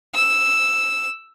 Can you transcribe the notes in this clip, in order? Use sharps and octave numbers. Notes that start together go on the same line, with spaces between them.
E6